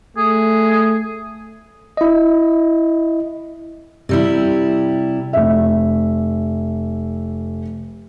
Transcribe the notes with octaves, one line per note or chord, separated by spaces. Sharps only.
A3 G#4
E4 D#5
C3 G3 E4
F1 E5